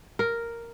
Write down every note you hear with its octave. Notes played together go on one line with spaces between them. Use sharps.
A#4